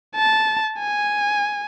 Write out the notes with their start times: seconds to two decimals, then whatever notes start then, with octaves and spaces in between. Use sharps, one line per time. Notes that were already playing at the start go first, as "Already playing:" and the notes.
0.16 A5
0.79 G#5